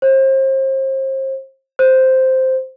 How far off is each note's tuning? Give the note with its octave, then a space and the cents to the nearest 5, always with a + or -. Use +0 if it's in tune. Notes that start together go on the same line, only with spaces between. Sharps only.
C5 +35
C5 +0